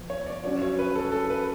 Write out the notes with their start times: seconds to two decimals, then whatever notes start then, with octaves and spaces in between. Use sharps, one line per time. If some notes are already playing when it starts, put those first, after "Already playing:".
Already playing: F3 B3
0.10 C#5
0.26 D5
0.44 F#3 C#4 F#4 C#5
0.62 C#5
0.79 B4
0.95 A4
1.12 A4
1.30 B4